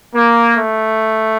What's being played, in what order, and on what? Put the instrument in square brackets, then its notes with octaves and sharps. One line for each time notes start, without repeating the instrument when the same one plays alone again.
[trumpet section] A#3
A3